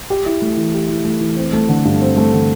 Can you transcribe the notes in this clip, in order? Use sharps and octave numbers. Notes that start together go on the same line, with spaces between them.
G4
E4
A3
E3
G4
E4
A3
E3
C4
A3
D3
G2
C4
A3
D3